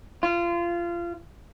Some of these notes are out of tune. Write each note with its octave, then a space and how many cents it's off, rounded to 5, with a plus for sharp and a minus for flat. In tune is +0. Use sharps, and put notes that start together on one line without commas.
F4 -25